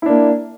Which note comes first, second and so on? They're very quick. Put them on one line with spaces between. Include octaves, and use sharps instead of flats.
E4 D4 A#3